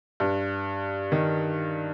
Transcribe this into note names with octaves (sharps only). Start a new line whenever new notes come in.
G2
D#3